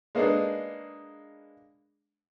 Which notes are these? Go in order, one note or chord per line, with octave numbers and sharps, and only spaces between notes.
G#3 A#3 B3 D4 D#4 G#4